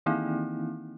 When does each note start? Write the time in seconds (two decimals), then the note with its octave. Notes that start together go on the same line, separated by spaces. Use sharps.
0.06 D#3 E3 A#3 C4 D#4 E4